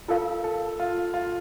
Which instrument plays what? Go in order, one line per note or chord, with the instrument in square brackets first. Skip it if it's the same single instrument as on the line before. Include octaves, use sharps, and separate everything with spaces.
[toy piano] F4 A#4 F5 [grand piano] A4
[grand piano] A4
F4
F4